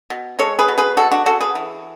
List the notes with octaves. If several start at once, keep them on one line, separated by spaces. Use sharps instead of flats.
B2
G#3 A4 C#5
G#4 B4
B2
G#4 B4
G#3 F#4 A4
D4 F#4
C#3 F#4 A4
G#4 B4
E3